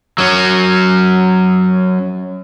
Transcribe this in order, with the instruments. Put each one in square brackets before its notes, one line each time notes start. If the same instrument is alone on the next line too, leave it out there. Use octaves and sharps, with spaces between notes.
[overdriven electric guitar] F#3 C#4